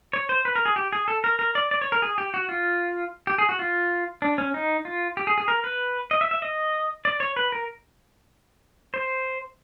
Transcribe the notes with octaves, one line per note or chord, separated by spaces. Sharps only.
C#5
C5
B4
A#4
G#4
G4
G#4
A4
A#4
A#4
D5
D5
C#5
A#4
G#4
G4
F#4
F4
G4
G#4
F#4
F4
D4
C#4
D#4
F4
G4
G#4
G#4
A#4
B4
D#5
E5
E5
D#5
D5
C#5
B4
A#4
C5